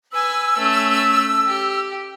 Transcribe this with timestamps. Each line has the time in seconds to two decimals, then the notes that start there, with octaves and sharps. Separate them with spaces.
0.12 B4 G#5 E6
0.58 A3 C#4
1.47 G4